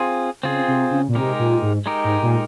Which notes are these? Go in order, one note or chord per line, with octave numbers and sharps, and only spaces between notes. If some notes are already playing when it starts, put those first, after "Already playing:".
Already playing: C4 F4 G#4
C#3 C4 F4 G#4
C3
C#3
A#2
C3 G#3 D#4 G4 A#4
A#2
G#2
G#3 D#4 G4 A#4
G#2
A#2